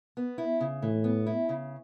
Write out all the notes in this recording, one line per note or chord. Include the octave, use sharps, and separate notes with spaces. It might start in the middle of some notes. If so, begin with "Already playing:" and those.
B3
E4
C#3
A2 E3
B3
E4
C#3